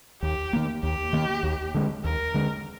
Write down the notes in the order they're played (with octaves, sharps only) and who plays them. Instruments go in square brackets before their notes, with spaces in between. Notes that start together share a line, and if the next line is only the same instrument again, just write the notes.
[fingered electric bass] D#2 [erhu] G4
[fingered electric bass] D#3 A#3
[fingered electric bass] D#2 [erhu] G4
[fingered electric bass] D#3 A#3
D#2
D3 G#3
[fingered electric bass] D#2 [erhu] A#4
[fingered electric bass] D3 G#3